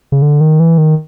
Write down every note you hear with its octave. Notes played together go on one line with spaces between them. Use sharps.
C#3
D3
D#3
E3
D#3